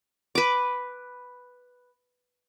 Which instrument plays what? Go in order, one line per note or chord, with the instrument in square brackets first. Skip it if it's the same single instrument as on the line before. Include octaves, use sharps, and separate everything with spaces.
[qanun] B4 D6